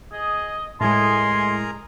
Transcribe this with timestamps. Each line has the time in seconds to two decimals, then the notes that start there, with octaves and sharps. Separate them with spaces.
0.13 G#4 D#5
0.81 A2 G#3 G#4 A#4 G#5 A#5 C6